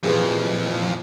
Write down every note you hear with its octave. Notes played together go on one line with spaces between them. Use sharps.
F2 A#2 E3 F3 G4 G#4 B4